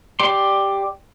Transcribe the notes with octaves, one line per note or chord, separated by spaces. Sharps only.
G4 D5 C6